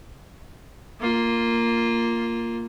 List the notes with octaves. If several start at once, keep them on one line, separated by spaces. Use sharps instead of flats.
A#3 F4